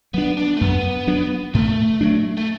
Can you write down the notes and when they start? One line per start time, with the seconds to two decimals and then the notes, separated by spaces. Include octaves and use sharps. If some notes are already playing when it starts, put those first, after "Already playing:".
0.14 F#3 B3 D4
0.37 D4
0.57 A3
0.61 F#2 B3
1.07 F#3 D4
1.54 A2 A3
2.01 F#3 D4
2.37 A3